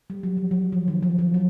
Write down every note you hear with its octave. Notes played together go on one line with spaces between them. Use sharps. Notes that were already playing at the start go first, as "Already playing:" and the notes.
G3
F#3
F3
F#3
F3
D#3
F3
F3
F#3